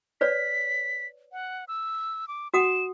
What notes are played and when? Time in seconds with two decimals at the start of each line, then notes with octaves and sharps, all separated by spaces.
0.21 B4 C#5 D5 B6
1.32 F#5
1.68 E6
2.28 D6
2.54 F#4 F#5 D#6 E7